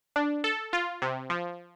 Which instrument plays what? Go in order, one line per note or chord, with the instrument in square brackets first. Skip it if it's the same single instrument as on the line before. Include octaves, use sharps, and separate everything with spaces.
[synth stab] D4
A4
F4
C3
F3